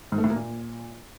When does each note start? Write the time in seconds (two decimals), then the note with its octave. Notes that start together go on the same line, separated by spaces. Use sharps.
0.12 G#2
0.18 A3
0.24 A2
0.30 A#3
0.36 A#2